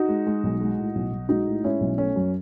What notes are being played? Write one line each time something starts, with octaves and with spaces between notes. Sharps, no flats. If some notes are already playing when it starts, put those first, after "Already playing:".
Already playing: D#4 F#4
G#3
G#3
B1
G#3
A2
B1
B1
G#3 D#4 F#4
A2
G#3 C#4 E4
B1
A3 C#4
F#2